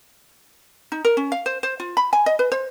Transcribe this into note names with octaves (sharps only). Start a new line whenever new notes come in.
D#4
A#4
C#4
F5
C5
C5
F4
B5
G#5
D#5
B4
C5